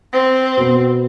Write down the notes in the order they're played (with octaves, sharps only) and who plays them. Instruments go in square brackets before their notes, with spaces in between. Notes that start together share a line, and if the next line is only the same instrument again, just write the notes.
[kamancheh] C4
[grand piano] B2 B3